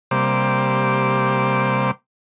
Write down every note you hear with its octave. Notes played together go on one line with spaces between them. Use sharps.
C3 G3 A#3 C5 D6